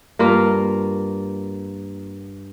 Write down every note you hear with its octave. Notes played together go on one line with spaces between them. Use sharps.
G2 A#3 F4